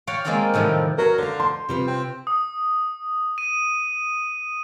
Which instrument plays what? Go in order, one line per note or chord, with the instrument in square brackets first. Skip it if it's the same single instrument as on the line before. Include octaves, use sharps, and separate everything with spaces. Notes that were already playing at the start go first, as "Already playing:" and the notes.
[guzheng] F#4 C#5 D5 F5 G5
G#3 A#3 C4 F4 D5 G5
A2 C3 D#3 F3 G3
[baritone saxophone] F#3 [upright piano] A#4
[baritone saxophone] D3 [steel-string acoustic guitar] C5 F5
[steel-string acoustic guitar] C5 [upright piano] C6
[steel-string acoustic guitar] C3 F4 B4 [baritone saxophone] G3
[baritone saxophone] C4
[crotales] D#6
D#7